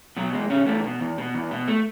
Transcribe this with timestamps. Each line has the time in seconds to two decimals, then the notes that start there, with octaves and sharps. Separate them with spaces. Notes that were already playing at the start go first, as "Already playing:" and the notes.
0.17 B2 F#3
0.33 E2 G#3
0.50 B2 C#4
0.67 E2 A3
0.84 B2
1.00 E2
1.18 B2
1.35 E2
1.51 B2
1.68 A3